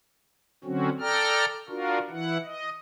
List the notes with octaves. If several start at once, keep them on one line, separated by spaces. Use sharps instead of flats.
D3 F#3 C4 C#4 F#4
A4 D5 G5 A#5 F6
D4 F4 F#4 A#4
E3 E4 F#5
D#5